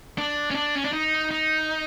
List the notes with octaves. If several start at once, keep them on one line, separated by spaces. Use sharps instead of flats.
D4
C#4
D4
C#4
D4
D#4
D#4